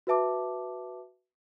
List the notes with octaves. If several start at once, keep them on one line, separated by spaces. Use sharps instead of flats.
F#4 B4 E5 A5 D6